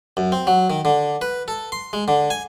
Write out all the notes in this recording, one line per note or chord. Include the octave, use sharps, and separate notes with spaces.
F#2
C4
F#3
D#3
D3
B4
A4
C6
G#3
D3
G#5